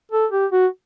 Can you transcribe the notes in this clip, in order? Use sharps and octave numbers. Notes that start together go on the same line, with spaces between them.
A4
G4
F#4